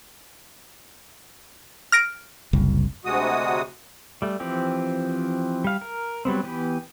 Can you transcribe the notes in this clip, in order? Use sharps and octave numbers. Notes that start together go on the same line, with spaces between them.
F6 A#6 D7
F#1 C2
D2 C3 G#3 F#4 D#6
G3 A3
E3 F3 C4 G4
G3 F5
A#4
F#3 G3 B3 C4
E3 B3 G4